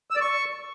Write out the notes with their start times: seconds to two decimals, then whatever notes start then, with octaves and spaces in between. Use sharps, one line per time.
0.11 E6
0.16 D5
0.21 C#6